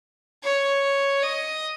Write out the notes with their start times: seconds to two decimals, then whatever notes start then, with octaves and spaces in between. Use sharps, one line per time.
0.43 C#5
1.23 D#5